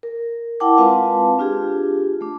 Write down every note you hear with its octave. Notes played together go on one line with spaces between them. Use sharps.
A#4
E4 A#4 F#5 G5 A5 D6
G#3 C4 F4 B4 F5 A5
D4 F4 G4 G#4
A3 D4